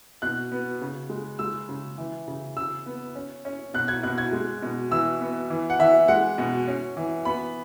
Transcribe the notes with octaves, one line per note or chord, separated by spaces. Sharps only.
B2 F#6
B3
C#3
G#3
G#3 E6
C#3
E3
C#3
C#3 E6
B3
C#4
C#4
B2 F#6
G#6
B2 F#6
G#6
G#3
B2
E3 E6
B3
E3
F#5
E3 E5
G#3 F#5
B2
C#4
E3
B3 B5